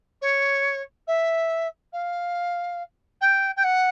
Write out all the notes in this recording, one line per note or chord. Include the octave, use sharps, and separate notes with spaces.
C#5
E5
F5
G5
G5
F#5